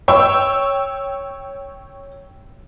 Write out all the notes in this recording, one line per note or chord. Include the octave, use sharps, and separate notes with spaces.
C#5 G5 C#6 E6